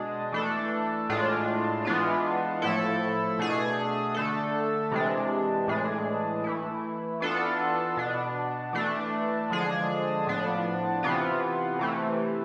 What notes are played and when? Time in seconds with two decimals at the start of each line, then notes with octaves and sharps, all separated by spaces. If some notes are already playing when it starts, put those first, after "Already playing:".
Already playing: B2 G#3 D4 G#4
0.32 E3 A3 D4 A4
1.09 A2 G#3 D4 F4
1.85 E3 G#3 B3 D4 F4
2.62 A2 F3 A3 E4 A4
3.39 B2 A3 D4 G#4
4.14 D3 A3 D4 A4
4.92 C3 E3 G#3 D4
5.67 A2 E3 G#3 D4 G#4
6.44 E3 A3 E4
7.20 E3 B3 D4 F4 A4
7.97 B2 B3 D4
8.73 E3 A3 D4
9.50 D3 F3 G#3 D4 G#4
10.27 A2 F3 B3 D4
11.03 C3 E3 B3 F4
11.79 C3 E3 A3